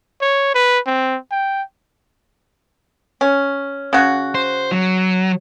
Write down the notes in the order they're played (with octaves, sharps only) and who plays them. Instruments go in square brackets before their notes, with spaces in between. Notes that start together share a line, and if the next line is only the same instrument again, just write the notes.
[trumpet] C#5
B4
C4
G5
[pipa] C#4
C#3 F#4
[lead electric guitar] C5
F#3